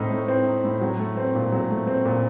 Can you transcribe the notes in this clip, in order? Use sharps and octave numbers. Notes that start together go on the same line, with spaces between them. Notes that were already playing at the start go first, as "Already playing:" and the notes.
Already playing: A2 A3 C4 D#4
A3
C4
D#4
A2
F#3
A3
C4
A#2
F#3
A3
C4
A#2